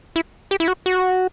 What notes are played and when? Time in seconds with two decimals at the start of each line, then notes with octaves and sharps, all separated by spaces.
0.16 E4
0.51 G4
0.60 E4
0.68 F#4
0.86 F#4